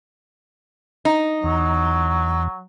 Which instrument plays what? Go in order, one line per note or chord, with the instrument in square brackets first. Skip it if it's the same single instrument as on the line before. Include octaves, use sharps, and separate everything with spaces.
[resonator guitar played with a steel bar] D#4
[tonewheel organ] E2 [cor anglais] F#3